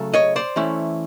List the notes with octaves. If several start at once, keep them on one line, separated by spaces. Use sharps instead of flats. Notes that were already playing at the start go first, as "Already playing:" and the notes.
Already playing: C#3 F#3 A3
C#5 D#5
C5 D5
E3 A3 C#4 E4